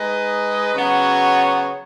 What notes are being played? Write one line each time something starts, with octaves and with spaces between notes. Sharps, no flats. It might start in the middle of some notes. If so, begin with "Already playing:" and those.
Already playing: G#3 D#4 B4 D#5
C#3 F#3 B3 F#4 C#5